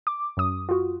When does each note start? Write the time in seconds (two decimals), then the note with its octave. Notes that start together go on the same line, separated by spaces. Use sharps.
0.07 D6
0.37 F#2 D#6
0.69 F4 F#4